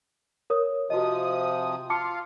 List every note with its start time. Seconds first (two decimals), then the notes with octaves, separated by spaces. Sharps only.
0.50 A#4 C#5 D#6
0.90 C3 F3 F#4 D#5 D#6
1.90 F4 F5 A5 D6 C#7